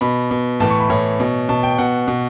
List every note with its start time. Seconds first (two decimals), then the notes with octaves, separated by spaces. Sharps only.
0.01 B2 B5
0.31 B2
0.60 A2 E3 A5
0.70 C#6
0.80 B5
0.90 A2 E3 C#5
1.20 B2
1.49 B2 A5
1.63 G5
1.78 B2 F#5
2.08 B2